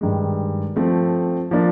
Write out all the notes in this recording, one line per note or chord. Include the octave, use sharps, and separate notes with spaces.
G2 D#3 G#3
F3 A3 C4
F3 A#3 D4